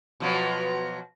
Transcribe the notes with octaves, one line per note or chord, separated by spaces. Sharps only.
B2 F3 F#3